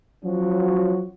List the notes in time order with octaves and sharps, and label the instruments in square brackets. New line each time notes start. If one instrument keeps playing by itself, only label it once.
[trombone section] F3 F#3 C#4 F#4